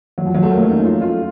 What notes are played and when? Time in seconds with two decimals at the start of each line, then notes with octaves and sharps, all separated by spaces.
0.18 F#3
0.26 F3
0.34 F#3
0.43 A3
0.51 A#3
0.63 C#4
0.68 D#4
0.84 F4
1.01 F4